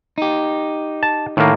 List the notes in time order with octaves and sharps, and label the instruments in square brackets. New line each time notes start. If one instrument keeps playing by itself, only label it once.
[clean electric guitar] D#4 G4
[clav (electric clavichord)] A5
[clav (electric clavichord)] A2 A#3 [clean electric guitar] D#3